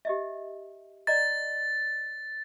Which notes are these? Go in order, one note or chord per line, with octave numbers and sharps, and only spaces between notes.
G4 D#5 E5
D5 D#5 A#5 A6